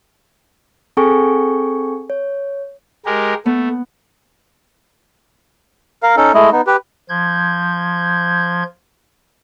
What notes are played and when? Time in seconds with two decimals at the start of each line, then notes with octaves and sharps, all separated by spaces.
0.97 C4 G#4 A4 G5 G#5 C#6
2.10 C#5
3.06 G#3 G4 A#4
3.46 A3 B3
6.03 A#4 F5
6.17 C#4 D#4 A4
6.34 G#3 A3 E4 D#5
6.52 B3 D#4
6.67 G4 B4
7.09 F3 G6 G#6